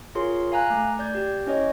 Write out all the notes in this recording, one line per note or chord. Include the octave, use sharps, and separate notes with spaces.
F4 G#4 A#4 C#5 C6
F5 G#5 A#5 F#6
A3
D5 G6 G#6
G4
C#4 E4 C#5 D#5